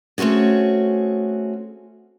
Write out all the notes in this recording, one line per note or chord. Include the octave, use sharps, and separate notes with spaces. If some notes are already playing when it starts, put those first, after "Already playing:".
A3 C4 C#4 F#4 G#4